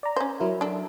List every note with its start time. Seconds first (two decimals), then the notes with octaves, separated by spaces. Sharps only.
0.03 D5 A#5
0.16 C#4 C5
0.40 F#3 E4 A#4
0.61 D4 A4